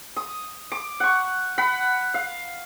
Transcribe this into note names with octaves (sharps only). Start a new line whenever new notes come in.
D#6
D6
F#5 C#6
F#5 B5
F5